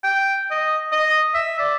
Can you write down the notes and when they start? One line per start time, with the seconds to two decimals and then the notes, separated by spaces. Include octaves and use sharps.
0.04 G5
0.51 D#5
0.92 D#5
1.34 E5
1.59 D5